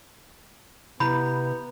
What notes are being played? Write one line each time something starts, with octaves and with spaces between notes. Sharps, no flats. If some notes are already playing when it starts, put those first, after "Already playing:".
C3 B3 E4 A#5 B5 G6